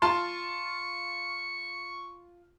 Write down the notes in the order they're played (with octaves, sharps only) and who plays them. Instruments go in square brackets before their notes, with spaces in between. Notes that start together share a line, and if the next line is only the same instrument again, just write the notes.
[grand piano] F4 A5 C6 [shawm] C#6